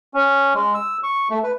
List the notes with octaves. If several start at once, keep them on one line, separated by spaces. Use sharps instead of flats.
C#4
G#3
E6
C#6
A3
B4